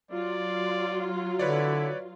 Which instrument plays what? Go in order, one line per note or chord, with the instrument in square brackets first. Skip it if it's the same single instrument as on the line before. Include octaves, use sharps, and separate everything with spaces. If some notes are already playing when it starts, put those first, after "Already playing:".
[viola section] F#3 F4 [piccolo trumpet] D5
[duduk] D3 [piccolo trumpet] E4 [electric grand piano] B4 C#5 D5